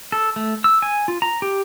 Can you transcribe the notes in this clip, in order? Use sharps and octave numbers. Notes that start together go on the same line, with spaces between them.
A4
A3
E6
G#5
F4
A#5
G4